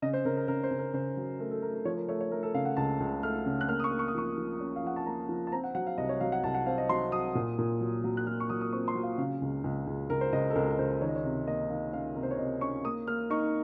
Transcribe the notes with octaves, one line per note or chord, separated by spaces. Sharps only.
C#3 D#5
C5
C#3 A#4
A#4
C#3 A#4
C5
C#3
A#4
C#3 C5
F#3
A3 A#4
A4
A3 A#4
A#4
F3 C#5
A#4
A3 C#5
C#5
A3 A#4
A4
C#3 F5
F#5
C#2 A5
C#2
A3 F6
C#3
F#6
A#3 F6
D#6
C#6
A#3
C#6
D#6
F3 C#6
F3
C#4
F5
F3 F#5
A5
A#3 A#5
F3
A5
C4 A#5
F#5
F#3 F#5
F5
C2 D#5
C#5
F#3 F5
F#5
C2 A5
F#5
C4 F5
D#5
F#3 C6
F#3 D#6
A#2
A#2
F#3
F#3
F#6
F#3 F6
C#6
F#3 D#6
D#6
C4 C#6
C6
F#3
F5
C#3 F5
C#2
C#2
C#2
C#2 A#4
C5
C#2 D#5
A4
C#2 A#4
A#4
C#2 C5
D#3 C#5
D#5
C#5
C3
A#3 D#5
D#3 F5
C#4 F5
C3 A#4
C5
C#5
C3 D#5
C#4 C#6
A#3 D#6
A#3 F6
D#4 C#6